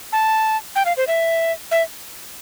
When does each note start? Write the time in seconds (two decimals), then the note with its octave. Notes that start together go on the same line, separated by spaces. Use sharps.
0.13 A5
0.76 G5
0.85 F5
0.97 C5
1.07 E5
1.71 E5